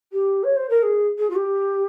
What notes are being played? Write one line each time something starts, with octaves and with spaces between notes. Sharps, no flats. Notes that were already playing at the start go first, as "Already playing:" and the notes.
G4
C#5
C5
A#4
G#4
G#4
F4
G4